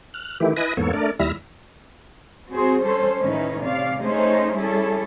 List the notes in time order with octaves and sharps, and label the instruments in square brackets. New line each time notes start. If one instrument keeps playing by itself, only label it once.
[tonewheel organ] F6 F#6
D#3 E3 A3 E4 G4
E4 B4 D#5 G#5 A#6
E2 G#2 A#3 B3 A4 C#5
A3 D4 A#4 D5
D#2 G3 E4 E5 F6 A#6
[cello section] C4 F#4 G#4 C5
G3 C#4 A4 C5
A2 D#3 C#4 D#4 E4 B4
C3 C#4 D5 F5
A3 C#4 D#4 G#4 C5
G3 C#4 E4 G#4 A4